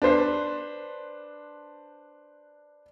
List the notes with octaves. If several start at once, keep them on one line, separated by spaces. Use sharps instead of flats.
D4 B4 C5 C7